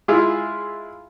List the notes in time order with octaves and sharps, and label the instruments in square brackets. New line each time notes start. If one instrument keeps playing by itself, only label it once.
[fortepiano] G#3 E4 F4 G#4 E5